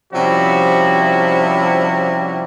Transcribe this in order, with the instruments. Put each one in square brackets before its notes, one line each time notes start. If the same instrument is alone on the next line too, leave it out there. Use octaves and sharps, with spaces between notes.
[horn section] C3 F3 G3 C#4 E4 F#4